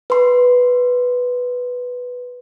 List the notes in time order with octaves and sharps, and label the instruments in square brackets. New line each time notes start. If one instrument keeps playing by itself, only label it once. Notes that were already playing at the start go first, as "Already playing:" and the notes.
[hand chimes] B4 C6